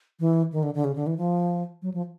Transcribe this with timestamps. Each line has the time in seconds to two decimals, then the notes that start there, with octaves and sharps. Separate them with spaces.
0.20 E3
0.52 D#3
0.63 D3
0.74 D3
0.84 C#3
0.96 D3
1.07 E3
1.17 F3
1.82 F#3
1.94 F3